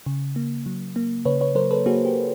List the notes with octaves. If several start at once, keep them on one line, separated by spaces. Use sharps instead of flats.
C#3
A#3
F#3
A#3
C#3 B4 C#5
B4 C#5
F#3 A#4 C5
A4 B4
A#3 F#4 G#4
G4